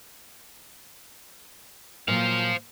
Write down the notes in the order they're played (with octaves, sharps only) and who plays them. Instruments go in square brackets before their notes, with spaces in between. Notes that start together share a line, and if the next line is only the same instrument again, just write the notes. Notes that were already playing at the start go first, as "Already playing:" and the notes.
[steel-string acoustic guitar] A#2 F#3 [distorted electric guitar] C5 F5